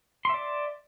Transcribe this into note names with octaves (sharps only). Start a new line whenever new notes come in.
D5 E5 C6